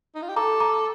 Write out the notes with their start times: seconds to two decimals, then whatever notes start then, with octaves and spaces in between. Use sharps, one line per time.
0.15 D#4
0.22 F4
0.29 G4
0.36 A4 A#5 D6
0.60 A#5 D6